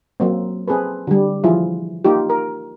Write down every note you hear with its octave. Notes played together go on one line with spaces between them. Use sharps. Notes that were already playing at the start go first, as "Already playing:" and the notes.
F#3 A#3 C4
C4 G#4 A4 B4
D3 G3
E3 F3 E4 F4 G#4
A#3 D#4 F4 G4
A#4